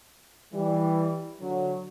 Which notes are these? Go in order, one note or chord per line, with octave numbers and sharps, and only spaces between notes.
E3 G3
D3 F#3